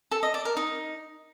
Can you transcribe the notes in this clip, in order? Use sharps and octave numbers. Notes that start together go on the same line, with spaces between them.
A4
D#5
D5
A#4
D#4